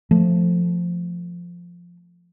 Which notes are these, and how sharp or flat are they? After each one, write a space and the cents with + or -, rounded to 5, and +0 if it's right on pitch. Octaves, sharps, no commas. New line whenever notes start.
F3 +0 A3 +0